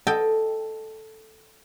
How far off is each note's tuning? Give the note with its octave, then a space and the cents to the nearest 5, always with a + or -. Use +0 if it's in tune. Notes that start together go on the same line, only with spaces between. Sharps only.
A4 +0 D#5 +0 G5 +10